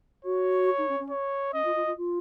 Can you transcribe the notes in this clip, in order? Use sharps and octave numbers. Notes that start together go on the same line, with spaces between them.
F#4 C#5
D#4
C#4
C#4
C#5
C#4 D#5
F4
F4
F4
F4